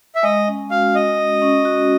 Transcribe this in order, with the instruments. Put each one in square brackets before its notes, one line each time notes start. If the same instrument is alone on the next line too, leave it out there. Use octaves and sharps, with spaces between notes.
[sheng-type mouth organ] E5
[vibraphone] G#3 [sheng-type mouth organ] D#5
[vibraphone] C#4
[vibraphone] F#4 [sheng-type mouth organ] F5
[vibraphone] G#3 [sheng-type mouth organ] D#5
[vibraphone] G#3
C#4
F#4